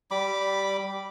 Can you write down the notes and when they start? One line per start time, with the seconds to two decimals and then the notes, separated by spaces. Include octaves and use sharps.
0.11 G3 B5 D6